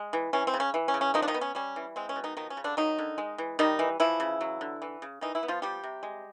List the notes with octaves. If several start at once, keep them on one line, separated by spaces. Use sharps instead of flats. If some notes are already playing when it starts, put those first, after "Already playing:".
Already playing: G#3
E3
E3 C#4
C4
C#3
C#4
E3
C#4
C#3
C#4
D#3 F3 D#4
D4
D#3 D#4
B3
C#4
G3 C#4
E3
G#3 C4
C#4
B2
D#3 D#4
D#3 F3 D#4
C#4
C#3
D3 D4
D#3 F#3 D#4
D3
G#3
E3
D#3 G3 D#4
E3
E3 F3 E4
C#3
F#3
D3
E3
C#3
D#3 E3 D#4
E3 E4
B3
F3 F4
F3 G3 G4
C3
G#3